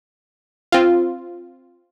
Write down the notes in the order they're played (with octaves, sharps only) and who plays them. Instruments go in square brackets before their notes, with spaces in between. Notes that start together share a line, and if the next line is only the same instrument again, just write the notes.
[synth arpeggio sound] C4 F4